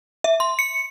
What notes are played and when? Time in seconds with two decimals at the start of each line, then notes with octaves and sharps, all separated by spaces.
0.24 E5
0.40 C6
0.59 C#7